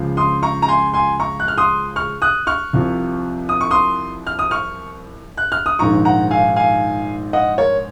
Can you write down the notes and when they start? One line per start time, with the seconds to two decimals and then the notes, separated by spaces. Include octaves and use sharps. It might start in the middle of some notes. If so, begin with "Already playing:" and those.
Already playing: C#2 C#3 F3
0.17 C6 D#6
0.43 A#5 C#6
0.62 A#5
0.68 G#5 C6
0.94 G#5 C6
1.20 A#5 C#6
1.40 F#6
1.48 F6
1.57 C6 D#6
1.96 C#6 F6
2.22 D#6 F#6
2.47 C#6 F6
2.73 C2 C3 F3
3.49 D#6
3.61 C#6
3.71 C6 D#6
4.27 F6
4.39 D#6
4.51 C#6 F6
5.38 F#6
5.52 F6
5.66 D#6
5.79 A#1 G#2 D#3 A#5 C#6
6.05 F#5 A#5
6.31 F5 G#5
6.56 F5 G#5
7.33 D#5 F#5
7.58 A#4 C#5